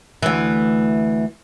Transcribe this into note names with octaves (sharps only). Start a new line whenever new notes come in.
D2 E3